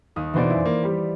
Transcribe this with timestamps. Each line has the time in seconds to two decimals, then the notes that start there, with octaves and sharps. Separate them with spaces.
0.16 D#2 D#6
0.34 B2 D3 E3 C5 D5
0.50 F#2 E4
0.65 A#3
0.83 G3 G4